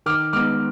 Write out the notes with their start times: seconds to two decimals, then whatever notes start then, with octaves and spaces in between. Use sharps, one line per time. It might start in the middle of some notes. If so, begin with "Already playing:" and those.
0.06 D#3 D6 F6
0.33 G#3 B3 D#4 D6 F6